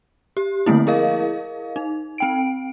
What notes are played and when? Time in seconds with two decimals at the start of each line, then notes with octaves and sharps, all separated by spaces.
0.37 G4
0.66 D3 F3 A3 A#3 C4 E4
0.87 E4 G#4 A#4 D#5 F5
1.76 D#4
2.18 C4 G5 D7